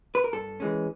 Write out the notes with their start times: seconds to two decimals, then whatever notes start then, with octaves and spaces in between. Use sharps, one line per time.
0.15 B4
0.24 A#4
0.33 G2 A4
0.60 E3 G#3 C#4